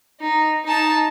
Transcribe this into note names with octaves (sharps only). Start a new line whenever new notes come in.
D#4
D#4 A5